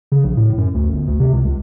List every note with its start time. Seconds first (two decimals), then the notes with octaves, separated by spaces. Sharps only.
0.12 C#3
0.24 A#1
0.37 A2
0.58 F#2
0.74 D2
0.92 G1
1.07 D2
1.20 C3
1.33 C#2
1.45 C#2